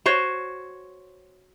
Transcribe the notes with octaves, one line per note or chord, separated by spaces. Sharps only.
F#4 C5 C#5